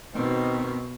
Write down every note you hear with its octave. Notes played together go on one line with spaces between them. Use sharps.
B2 D#3 C4